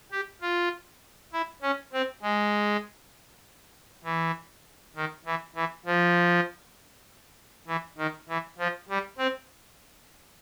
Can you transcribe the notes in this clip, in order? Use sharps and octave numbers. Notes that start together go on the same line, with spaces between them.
G4
F4
E4
C#4
C4
G#3
E3
D#3
E3
E3
F3
E3
D#3
E3
F3
G3
C4